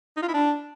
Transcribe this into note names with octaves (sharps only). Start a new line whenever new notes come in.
D#4
F4
E4
D4